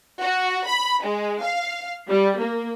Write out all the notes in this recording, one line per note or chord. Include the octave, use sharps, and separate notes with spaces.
F#4
B5
G#3
F5
G3
A#3